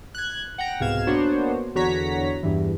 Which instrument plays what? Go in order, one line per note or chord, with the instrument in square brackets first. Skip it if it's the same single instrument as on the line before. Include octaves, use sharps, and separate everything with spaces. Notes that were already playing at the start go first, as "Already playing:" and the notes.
[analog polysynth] F#6 G#6
F#5 G5 A#5
C2 G#2 B2 F5 G#6 E7
A#3 B3 D4 F#4 C5 C#5
E2 D3 F#4 C#5 A#5 B6
E2 G2 E3